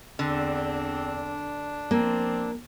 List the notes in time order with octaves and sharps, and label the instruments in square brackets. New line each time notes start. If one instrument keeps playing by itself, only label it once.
[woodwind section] E2 C4 [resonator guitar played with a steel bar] D3 [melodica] D4
[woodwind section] F3 C4 [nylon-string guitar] A#3